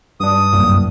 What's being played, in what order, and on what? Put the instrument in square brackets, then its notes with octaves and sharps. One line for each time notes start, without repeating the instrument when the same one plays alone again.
[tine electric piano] G2 D4 [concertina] D#6
[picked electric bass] C2 A2 A#3 [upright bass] F#2